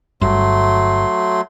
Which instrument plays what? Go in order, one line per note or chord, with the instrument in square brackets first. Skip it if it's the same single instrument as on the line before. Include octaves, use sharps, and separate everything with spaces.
[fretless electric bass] G1 G2 [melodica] F#3 A3 C6